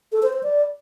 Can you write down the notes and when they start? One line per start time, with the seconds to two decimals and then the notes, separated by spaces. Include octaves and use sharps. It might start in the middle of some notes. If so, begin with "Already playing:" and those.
0.12 A4
0.23 C5
0.33 C5
0.43 D5